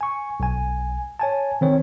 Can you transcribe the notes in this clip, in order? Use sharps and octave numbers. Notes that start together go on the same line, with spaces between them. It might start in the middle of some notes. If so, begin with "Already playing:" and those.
G#5 C#6
B1 G#5
C#5 G#5 A5
D#3 C4 C#5